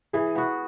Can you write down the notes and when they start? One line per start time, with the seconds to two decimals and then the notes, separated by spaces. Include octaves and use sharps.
0.13 E3 G#4
0.36 B3 F#4